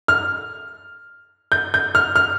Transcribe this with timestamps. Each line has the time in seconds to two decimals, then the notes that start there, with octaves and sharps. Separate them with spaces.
0.08 F6
1.52 G6
1.74 G6
1.95 F6
2.16 F6